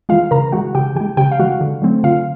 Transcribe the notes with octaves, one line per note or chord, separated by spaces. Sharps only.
E3 G#3 F4 F5
C#3 A#4 A#5
E3 G#3 F#4 F#5
C#3 G4 G5
E3 G4 G5
G#3
C#3 G4 G5
F5
E3 G#3 F#4 F#5
D3
F#3 A3 C4
D3 F4 F5